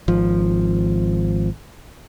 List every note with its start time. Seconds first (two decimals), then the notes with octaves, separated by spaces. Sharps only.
0.08 G#1 F3